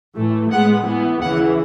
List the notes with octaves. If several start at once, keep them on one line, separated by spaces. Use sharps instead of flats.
A2 E3 A3
A2 G#3 B3 F#5
A2 E3 B3
D#2 C#3 E3 F#5